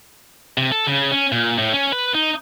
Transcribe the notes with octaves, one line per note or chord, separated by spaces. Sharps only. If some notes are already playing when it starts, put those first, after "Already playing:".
C3
A4
C#3
C#4
A#2
A2
C#4
B4
D#4